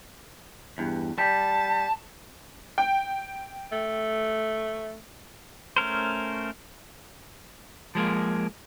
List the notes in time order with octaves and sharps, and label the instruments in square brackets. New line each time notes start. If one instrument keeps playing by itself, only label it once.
[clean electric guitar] E2 G2
[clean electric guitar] G3 [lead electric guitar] A5
[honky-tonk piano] G5
[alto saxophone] A3
[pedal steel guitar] A3 C#4 A#4 C5
[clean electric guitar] F3 G#3 A#3